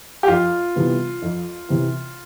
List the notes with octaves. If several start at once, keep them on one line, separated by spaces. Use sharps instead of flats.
G4
F2 F4
C3 E3 G3 B3
F2
C3 E3